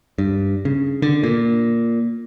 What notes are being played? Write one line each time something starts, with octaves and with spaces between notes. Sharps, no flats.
G2
C#3
D3
A#2